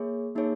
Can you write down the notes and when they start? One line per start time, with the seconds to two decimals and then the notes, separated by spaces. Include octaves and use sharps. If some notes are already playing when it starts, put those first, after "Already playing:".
Already playing: A#3 G#4 C#5
0.36 A#3 D#4 G#4 C#5